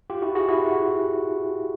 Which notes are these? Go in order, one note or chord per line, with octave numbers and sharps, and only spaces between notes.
F4 G4
E4 F#4
F#4 G#4
E4 F#4